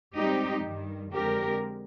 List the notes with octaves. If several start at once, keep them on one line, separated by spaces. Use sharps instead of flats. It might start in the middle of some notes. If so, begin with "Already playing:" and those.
G#2 G3 C4 D#4 G4
G2 D#3 G3
F2 D3 G#3 C4 G4 A#4